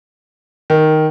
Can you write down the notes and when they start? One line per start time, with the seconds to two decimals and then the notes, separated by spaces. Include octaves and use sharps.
0.70 D#3